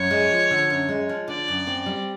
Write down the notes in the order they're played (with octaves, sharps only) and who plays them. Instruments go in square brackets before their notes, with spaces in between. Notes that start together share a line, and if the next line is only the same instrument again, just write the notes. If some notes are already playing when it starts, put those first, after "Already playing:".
Already playing: [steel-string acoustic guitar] F#2 [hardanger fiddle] C#5
[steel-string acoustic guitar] G#3
F3
D3
F#2
G#3
F3
[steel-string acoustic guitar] D3 [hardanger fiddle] D5
[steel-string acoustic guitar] F#2
C4
G3